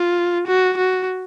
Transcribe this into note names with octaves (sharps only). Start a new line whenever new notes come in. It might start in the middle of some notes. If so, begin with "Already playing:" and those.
Already playing: F4
F#4
F#4